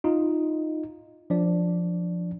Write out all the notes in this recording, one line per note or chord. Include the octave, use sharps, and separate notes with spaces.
D#4 F4
F3 D4 D5